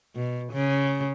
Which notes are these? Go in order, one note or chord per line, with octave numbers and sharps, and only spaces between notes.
B2
C#3